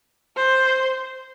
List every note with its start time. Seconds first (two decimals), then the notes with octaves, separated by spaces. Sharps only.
0.36 C5